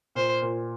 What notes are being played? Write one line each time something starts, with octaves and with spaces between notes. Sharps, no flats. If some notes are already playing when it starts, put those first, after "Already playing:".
A#2 C5
A#2